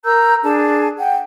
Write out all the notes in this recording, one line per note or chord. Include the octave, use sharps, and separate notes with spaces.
A#4 A#5 E6 G6
D4 G#4 A5
F#5 G5